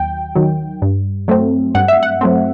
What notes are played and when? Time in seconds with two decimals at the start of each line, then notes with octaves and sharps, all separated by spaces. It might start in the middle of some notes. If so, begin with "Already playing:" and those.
Already playing: D#2 F#3 G5
0.35 D#3 F#3
0.82 G2
1.28 F#3 A3 C4
1.75 G2 F#5
1.88 E5
2.03 F#5
2.21 F#3 A3 C4